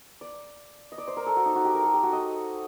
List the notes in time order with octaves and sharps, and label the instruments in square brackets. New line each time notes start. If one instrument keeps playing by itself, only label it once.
[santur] D5
D#5
D5
C5
A#4
A4
F#4
D#4
F#4
G4
A#4
A4
G4
F#4
D#5